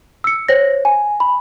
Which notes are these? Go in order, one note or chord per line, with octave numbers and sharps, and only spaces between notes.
E6 C#7
C5 C#5 A#6
G#5
B5